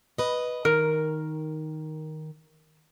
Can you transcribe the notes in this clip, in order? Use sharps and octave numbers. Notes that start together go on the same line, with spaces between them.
B4 D#5
D#3 A#4